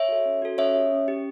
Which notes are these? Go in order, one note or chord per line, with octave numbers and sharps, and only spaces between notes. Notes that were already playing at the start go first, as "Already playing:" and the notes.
Already playing: C#5 E5
F#4 A4
C#4
F#4 A4
C#4 C#5 E5
G4
C#4
G4